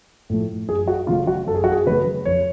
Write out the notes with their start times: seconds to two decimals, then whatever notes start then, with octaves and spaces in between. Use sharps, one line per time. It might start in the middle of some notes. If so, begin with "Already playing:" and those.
0.30 A2 F3 A3
0.68 F#2 G#4
0.88 F#4
1.07 C#3 F#3 A3 F4
1.27 F#4
1.47 F#2 A4
1.55 G#4
1.64 F#4
1.72 G#4
1.86 C#3 F#3 A3 B4
2.25 F2 C#5